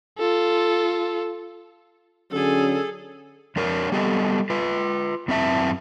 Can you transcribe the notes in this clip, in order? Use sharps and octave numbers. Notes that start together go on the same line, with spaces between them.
F4 A4
D3 F#3 C#4 G#4 A4
F2 D4 A#4 C#5
G3 B3 G4 A4 D#5
F4 B4
F#2 C4 E4 E5 A5